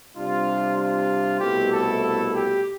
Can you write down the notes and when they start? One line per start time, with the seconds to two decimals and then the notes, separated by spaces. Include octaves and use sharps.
0.15 C3 G3 D4 F4
0.78 F4
1.40 C2 B2 A3 E4 G4
1.71 A4
2.33 G4